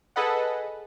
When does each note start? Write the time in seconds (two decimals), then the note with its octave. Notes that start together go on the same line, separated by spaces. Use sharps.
0.16 G#4 A4 B4 D#5 F#5